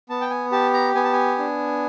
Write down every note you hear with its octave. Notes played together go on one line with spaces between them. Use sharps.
B3 A5
G5
G#5
G4 A5
A#5
B3 G#5
A5
G#5
D4